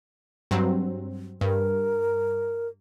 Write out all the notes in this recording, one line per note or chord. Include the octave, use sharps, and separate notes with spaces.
G2 F#3 C4
G2 A#4